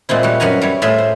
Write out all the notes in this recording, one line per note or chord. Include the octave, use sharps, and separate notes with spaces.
A#2 G#3 C4 E4
G3 F#4
F#2 F#4 B4 G#5 A#5
G3 E4 C#5
A2 F4 G#4 E5 B5 C6
C5